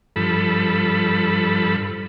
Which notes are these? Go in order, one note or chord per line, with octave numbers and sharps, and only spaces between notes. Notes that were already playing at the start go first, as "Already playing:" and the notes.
G2 F3 A4 B5